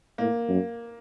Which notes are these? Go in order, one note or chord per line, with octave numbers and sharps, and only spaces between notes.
A2 A#3
F#2